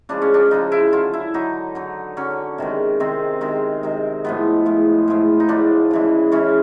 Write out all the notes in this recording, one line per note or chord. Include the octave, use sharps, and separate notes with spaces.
C#3 F3 G#3 D4
C#4
D4
C#3 F3 G#3 D#4
E4
D3 F#3 F4
E4
D3 F#3 D#4
D3 F#3
D3 F#3 C#4
C3 D#3 G#3
C3 D#3 G#3 C4
C3 D#3 G#3
C3 D#3 G#3
A2 F3 G#3 B3
A2 F3 G#3
A2 F3 G#3
D#4
A2 F3 G#3 D4
C#3 E3 G#3
C#3 E3 G#3 C#4